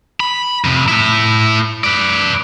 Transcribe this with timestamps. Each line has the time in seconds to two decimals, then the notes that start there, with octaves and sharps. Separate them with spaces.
0.20 B5
0.64 F2 C3
0.88 A2 E4
1.84 B4 D5